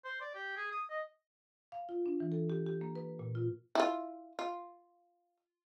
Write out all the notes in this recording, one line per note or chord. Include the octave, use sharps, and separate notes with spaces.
C5
D5
G4
G#4
D#6
D#5
F5
F4
D4
E3
A4
G4
G4
A#3
B4
A#2
F4
E4 F4
F4